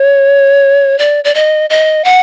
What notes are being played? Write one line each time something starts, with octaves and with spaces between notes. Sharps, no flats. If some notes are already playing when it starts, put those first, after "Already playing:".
Already playing: C#5
D5
D5
D#5
D#5
F#5